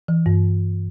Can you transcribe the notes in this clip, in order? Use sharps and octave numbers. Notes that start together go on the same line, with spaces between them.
E3
G2